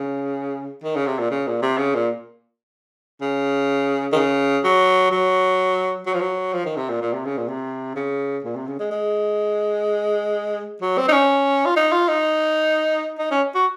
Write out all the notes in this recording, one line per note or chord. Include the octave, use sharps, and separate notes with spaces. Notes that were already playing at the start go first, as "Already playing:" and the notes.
Already playing: C#3
D#3
C#3
C3
A#2
C#3
A#2
C3
C#3
A#2
C#3
D#3
C#3
F#3
F#3
F#3
F3
F#3
F3
D#3
C3
A#2
A#2
C3
C#3
A#2
C3
C#3
A#2
C3
C#3
G#3
G#3
F#3
C4
D#4
C#4
F4
D#4
F4
D#4
D#4
C#4
F#4